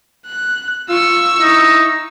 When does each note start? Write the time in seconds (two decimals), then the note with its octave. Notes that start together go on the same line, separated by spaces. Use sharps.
0.27 F#6
0.89 F4 C#6 E6
1.41 D#4 E4